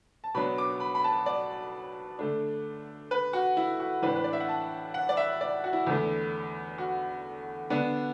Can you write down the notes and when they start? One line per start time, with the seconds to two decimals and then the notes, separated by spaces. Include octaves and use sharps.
0.24 A5
0.34 B2 F#3 B3 D4 B5
0.58 D6
0.80 B5
0.95 B5
1.04 A5
1.26 D5
2.19 D3 A3 D4
3.11 B4
3.33 F#4
3.57 E4
3.80 F#4
4.02 A2 E3 D4 B4
4.16 B4
4.24 D5
4.33 E5
4.40 F#5
4.49 A5
4.94 F#5
5.09 D5
5.17 E5
5.41 D5
5.64 F#4
5.73 E4
5.87 E2 D3 A3 E4
6.78 F#4
7.70 D3 B3 D4